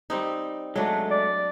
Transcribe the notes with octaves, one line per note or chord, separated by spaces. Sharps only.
G3 C4 D#4
F#3 G#3 A3 D4
D5